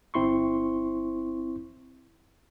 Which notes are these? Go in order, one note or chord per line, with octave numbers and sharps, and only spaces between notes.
G1 C4 E4 C6 C#6